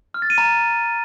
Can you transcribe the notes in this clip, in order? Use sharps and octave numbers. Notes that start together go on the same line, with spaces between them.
F6
A6
D#7
A#5